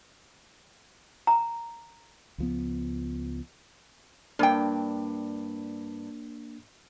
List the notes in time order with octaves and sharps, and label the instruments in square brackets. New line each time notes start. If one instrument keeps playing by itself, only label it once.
[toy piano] A#5
[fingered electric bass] C#2 F3 B3
[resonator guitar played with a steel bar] G2 G5 [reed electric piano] A#3 D4